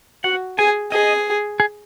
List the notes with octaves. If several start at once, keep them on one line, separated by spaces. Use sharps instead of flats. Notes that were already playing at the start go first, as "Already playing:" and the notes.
F#4 F#5
G#4 G#5
G#4 D#5
G#4